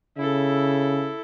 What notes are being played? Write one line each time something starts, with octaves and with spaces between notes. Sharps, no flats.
C#3 E4 A4